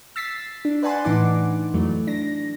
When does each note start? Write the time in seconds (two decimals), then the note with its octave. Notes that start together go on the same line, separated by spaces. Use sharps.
0.16 E6 A6 B6 C7
0.65 D4
0.83 B4 D5 F#5 G#5 A5 C6
1.04 A2 E3 D4 D#4 F#5 D6
1.74 F2 E3 F#3 A3
2.07 D4 A#6